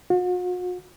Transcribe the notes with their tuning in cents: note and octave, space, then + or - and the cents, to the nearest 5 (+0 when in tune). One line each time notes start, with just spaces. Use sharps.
F#4 -45